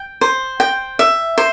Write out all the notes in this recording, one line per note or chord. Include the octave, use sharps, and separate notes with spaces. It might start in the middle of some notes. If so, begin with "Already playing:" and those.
Already playing: G5
C5
G5
E5
C5